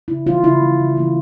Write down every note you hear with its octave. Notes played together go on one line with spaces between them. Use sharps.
C#3 E4
E3 G3 A#3 F4
C#3 E4
E3 G3 A#3
C#3
E3 G3 A#3